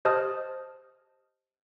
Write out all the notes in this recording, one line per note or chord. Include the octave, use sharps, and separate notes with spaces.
G4 C5 D#5 A5 D#6 F6